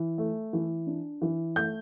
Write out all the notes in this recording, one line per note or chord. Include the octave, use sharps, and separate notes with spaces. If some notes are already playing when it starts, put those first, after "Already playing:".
Already playing: E3
A3
E3
D4
E3
A3 G6